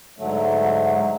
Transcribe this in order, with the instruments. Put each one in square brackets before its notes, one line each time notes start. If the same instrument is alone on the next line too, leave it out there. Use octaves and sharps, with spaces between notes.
[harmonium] G#2 D3 F#3 A3